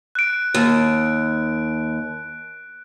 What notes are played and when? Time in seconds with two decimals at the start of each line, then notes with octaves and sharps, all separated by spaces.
0.15 F#6 D7
0.54 D#2